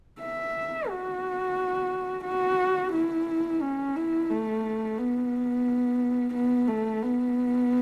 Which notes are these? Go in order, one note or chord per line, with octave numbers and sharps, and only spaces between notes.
E5
F#4
F#4
E4
C#4
E4
A3
B3
B3
A3
B3